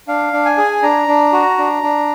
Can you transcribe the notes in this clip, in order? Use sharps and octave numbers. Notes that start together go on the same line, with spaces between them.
D4 F5
D4
G#5
G#4
D4 A#5
D4
F#4
D4
D4